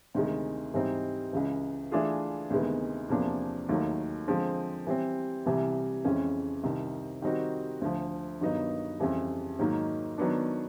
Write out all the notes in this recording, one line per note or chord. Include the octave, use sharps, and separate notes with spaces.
D2 C3 D#3 G#3
G#2 E3 G3 C4 D#4
C#2 C#3 E3
E3 A3 D4 F4 G#4
D2 C3 D#3 G#3 B3
E2 C3 F3 A#3 D4
D#2 D#3 F#3 A3
D3 F3 G#3 C4
E3 G3 C4
C2 C3 E3 G3
F2 C#3 E3 G#3 C#4
C2 C3 D#3
D#3 G3 C4 D#4 F#4
D2 D3 F3
G2 D#3 F#3 B3 D#4
F2 C#3 E3 G3
G#2 D#3 F#3 A#3 D#4
D#3 F#3 B3 D4